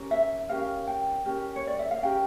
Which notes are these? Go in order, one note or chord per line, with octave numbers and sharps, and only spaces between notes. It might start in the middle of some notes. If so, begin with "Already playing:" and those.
Already playing: C#4 G4 A#4
E5
C#4 G4 A#4 F5
G5
C#4 G4 A#4
C#5
D5
E5
F5
C#4 G4 A#4 G5